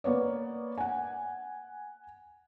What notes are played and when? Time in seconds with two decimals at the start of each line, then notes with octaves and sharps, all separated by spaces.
0.04 A#3 B3 C#5 D5
0.78 F#5 G#5